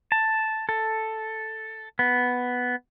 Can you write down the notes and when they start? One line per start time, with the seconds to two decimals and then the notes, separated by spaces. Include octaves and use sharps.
0.12 A5
0.69 A4
1.99 B3